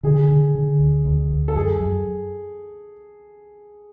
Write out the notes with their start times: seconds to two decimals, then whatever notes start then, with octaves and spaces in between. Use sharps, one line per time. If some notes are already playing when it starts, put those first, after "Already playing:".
0.03 D3 G#4
0.29 D3
0.55 D3
0.80 D2
1.05 D2
1.30 D2
1.48 A4
1.55 F#2 G#4
1.81 F#2